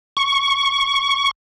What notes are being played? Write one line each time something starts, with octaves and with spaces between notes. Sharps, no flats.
C#6